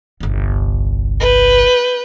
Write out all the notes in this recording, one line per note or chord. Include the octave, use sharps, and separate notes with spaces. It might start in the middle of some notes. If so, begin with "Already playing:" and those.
G1 C2
B4 G6